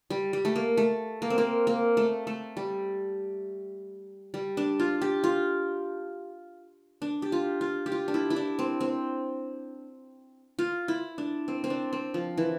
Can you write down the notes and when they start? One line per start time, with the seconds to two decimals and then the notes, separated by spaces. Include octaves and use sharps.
0.10 G3
0.33 G3
0.45 A3
0.56 A#3
0.77 A3
1.22 A#3
1.30 C4
1.38 A#3
1.67 A#3
1.97 A3
2.27 A3
2.57 G3
4.34 G3
4.57 D4
4.80 F4
5.02 G4
5.24 F4
7.02 D4
7.22 G4
7.32 F4
7.61 F4
7.86 G4
7.92 F4
8.08 D4
8.14 E4
8.30 E4
8.36 D4
8.59 C4
8.81 C4
10.59 F4
10.88 E4
11.18 D4
11.48 C4
11.64 C4
11.70 D4
11.93 C4
12.14 F3
12.38 E3